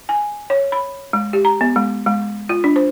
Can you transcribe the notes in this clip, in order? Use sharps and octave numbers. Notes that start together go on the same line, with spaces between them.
G#5
C#5
B5
G#3
G4
A#5
B3
G#3
G#3
F4
D4
C5